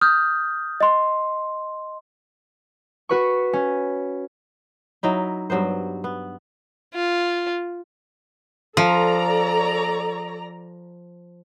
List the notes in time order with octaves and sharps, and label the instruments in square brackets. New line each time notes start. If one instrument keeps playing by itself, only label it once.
[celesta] D#6 F6 G6
D#5 C6
[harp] F#4 B4 C#6
C#4
[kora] F#3 D#4 E4
G2 F#3 B3 C5
B3
[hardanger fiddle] F4
[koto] F3 [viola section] A4 D5 A#5